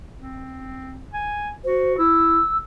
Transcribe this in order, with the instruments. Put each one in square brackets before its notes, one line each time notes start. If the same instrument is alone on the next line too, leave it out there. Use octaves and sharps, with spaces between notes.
[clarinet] C4
G#5
[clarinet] F#4 [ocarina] C5
[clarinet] E4 [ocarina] E6